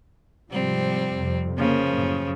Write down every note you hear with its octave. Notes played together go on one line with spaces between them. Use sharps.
G#2 C3 F3 G3 C4
F2 C3
C#3 F3 A#3
F#2 A2